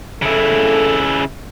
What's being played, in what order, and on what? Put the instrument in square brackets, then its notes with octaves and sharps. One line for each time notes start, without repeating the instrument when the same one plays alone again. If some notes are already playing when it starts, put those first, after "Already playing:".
[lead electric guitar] C#3 E4 [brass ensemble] A4